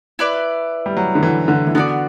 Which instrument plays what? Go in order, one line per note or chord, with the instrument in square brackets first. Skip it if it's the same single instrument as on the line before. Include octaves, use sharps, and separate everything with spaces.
[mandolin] E4 B4 D5
[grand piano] G3
F#3
D3
E3
D3
E3
[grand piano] D3 [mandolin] B3 F#4 A4 D5